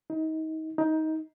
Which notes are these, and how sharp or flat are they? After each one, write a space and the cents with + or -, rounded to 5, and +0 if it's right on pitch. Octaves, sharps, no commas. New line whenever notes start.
D#4 +30
D#4 +20